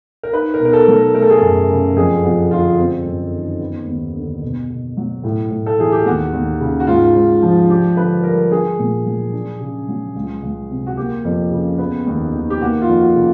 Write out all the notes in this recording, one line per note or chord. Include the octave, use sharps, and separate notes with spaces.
A#4
D#4 B4
A#4
B2
A#4
A4
F#3
A#4
A3 A#4
A4
G#4
F#2 A4
C#3
F2 G#4
F2 F#4
D3 F4
C4
F#2
D#3
B3
D#2
D3
B2
B2
F#3
A2
A2
A4
E3 G#4
G4
D#2 F#4
D#2
C#3
F#4
G#2 F4
G#2
F3
D4 G4
D3 B4
G3 A#4
D4 G#4
A#2
F#3
D4
C#3
F#3
C#2
C#2
C3
F#4
A#3 G4
F2
C#3
B3
D#2
D#3
G4
A#3 F#4
F4
F2
F#4
C#3